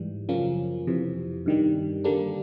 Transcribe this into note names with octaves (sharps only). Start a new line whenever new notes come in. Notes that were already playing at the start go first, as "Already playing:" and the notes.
Already playing: G#2 E3 G3
F#2 C#3 F3 A#3 C#4
F2 C3 E3
G2 D#3 G3
D3 G3 A#3 D4